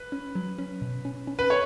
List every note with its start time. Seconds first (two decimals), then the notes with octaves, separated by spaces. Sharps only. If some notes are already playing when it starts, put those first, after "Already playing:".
Already playing: B4
0.12 C#4
0.35 F#3
0.58 C#4
0.82 B2
1.05 C#4
1.27 C#4
1.39 B4
1.50 A4 C#5